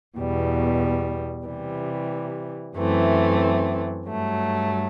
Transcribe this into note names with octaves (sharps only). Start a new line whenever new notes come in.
E2 B2 G3
C3 E3 G3
F#2 E3 A3 C4
G2 F#3 A3